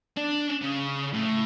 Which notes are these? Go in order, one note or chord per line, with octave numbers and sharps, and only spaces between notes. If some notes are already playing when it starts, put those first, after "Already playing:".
D4
C#3
A2